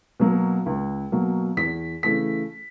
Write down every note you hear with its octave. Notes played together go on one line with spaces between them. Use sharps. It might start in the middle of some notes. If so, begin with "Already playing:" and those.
B2 F#3 A#3
C#2
B2 F#3 A#3
E2 B6
C#3 E3 A3 B6